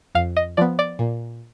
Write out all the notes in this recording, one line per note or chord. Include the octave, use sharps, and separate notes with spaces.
F2 F5
D#5
F3 B3 D5
D5
A#2